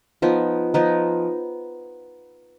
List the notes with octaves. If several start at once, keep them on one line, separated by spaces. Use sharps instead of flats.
F3 B3 D#4
F3 B3 D#4